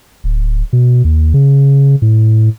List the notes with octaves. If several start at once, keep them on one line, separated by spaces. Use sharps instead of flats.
D1
B2
D#2
C#3
A2